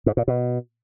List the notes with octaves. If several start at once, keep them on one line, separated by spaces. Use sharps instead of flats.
G#2
A#2
B2